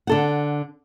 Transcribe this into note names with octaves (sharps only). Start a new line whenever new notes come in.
D3 A4 F#5